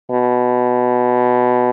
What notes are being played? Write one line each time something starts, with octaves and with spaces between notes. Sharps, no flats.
B2